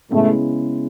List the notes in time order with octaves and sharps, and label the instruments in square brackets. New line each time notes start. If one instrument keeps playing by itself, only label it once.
[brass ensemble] A2 A3 [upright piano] C#3 G#3 B3 E4